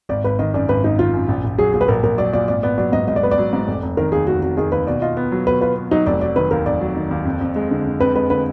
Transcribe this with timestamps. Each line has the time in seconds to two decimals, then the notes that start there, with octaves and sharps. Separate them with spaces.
0.09 G#1 D5
0.24 G#1 B4
0.39 D#3 D#5
0.54 F#2 D5
0.69 G#1 B4
0.84 G#1 D#4
0.99 D#3 F4
1.14 F#2
1.28 A#1
1.44 A#1
1.58 F#3 G#4
1.74 A#2 G#4
1.81 B4
1.88 A#1 A#4
2.03 A#1 A#4
2.18 F#3 D5
2.33 A#2 D5
2.48 G#1 D5
2.63 B3 D5
2.78 F#3 D5
2.92 G#2 D#5
3.08 G#1 D#5
3.16 D5
3.23 B3 B4
3.31 D5
3.38 F#3
3.53 G#2
3.68 F1
3.82 F1
3.97 D#3 A#4
4.12 D#2 G#4
4.27 F1 F#4
4.42 F1 F#4
4.57 D#3 G#4
4.72 D#2 B4
4.87 B2 D5
5.02 F4 D#5
5.17 B3
5.32 F#3
5.47 B2 B4
5.61 F4 B4
5.77 B3
5.91 F#3 D#4
6.06 F1 D5
6.21 F#3 D5
6.36 D#3 B4
6.51 D#2 A#4
6.66 F1 D5
6.81 F#3
6.96 D#3
7.11 D#2
7.25 F2
7.41 F2
7.56 G#3
7.71 D3
7.86 F2
8.00 F2 B4
8.15 G#3 B4
8.30 D3 B4